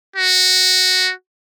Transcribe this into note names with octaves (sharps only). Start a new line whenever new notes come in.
F#4